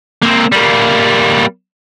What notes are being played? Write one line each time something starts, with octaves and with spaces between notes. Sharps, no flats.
A#3 C4
G3 A#3